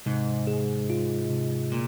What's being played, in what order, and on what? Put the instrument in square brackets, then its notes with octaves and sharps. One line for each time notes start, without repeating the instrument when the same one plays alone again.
[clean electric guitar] G#2 [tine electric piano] C3
[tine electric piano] G#4
F4
C3
[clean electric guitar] A#2